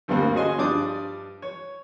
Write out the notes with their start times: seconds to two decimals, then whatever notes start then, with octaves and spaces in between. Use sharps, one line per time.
0.08 D2 G2 G3 A#3 C4
0.34 C#4 F#4 G#4 D#5 G#5 C6
0.58 G2 F3 D4 D6 D#6
1.42 C#5